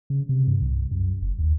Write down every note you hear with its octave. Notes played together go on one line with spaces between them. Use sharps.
C#3
C3
G2
C2
F#2
F#1
D#2